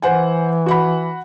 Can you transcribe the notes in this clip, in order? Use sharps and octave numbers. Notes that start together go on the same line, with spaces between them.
E3 C5 F#5 G#5
F#4 F#5 B5